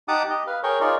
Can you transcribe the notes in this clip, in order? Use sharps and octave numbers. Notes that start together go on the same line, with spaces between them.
D#4 G4 F#5 A5 D6 D#6
G4 D#5
B4 F5
G#4 A#4 C#5 G5
D#4 F4 G#4 A#4 C#5 D5